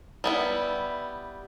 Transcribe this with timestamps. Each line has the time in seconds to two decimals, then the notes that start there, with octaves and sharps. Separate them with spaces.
0.24 G3 B3 E4